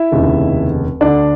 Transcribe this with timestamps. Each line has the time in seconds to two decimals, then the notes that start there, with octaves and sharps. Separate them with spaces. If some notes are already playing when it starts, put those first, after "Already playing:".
Already playing: E4 E5
0.12 F1 D#2 C#3
1.00 D2 D3 D4 D5